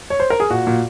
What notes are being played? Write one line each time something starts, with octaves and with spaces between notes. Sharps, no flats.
C#5
C5
A#4
G#4
A#2 F#4
A#2